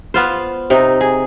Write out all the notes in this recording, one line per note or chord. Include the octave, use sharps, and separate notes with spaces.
B3 F4 C5
C3 D#4
G#4